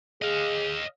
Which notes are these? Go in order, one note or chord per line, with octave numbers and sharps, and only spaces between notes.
G#4 D#5 F5